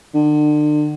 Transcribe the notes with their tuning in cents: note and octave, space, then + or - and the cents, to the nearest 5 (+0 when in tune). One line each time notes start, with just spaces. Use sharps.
D3 +35